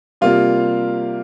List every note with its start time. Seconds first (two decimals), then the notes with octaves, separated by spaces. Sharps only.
0.21 C3 G3 A#3 F4